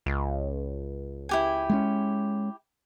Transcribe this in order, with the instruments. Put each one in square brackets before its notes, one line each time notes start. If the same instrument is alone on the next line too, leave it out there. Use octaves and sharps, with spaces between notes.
[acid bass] C#2
[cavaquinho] E4 G4 G#5
[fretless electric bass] G#3 A3 C#4